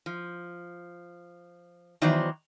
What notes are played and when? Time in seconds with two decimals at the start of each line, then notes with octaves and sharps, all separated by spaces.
0.06 F3
2.02 D#3 E3 F#3 B3 C5 D5